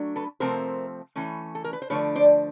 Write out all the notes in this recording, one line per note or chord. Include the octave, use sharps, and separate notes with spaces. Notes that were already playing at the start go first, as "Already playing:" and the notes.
Already playing: F#3 A3 D4
A4 B4
C3 F3 A3 C4 A#4 C5
E3 A3 C#4
A4
A#4
B4
C5
D3 F3 A3 D4 B4 C#5
C5 D5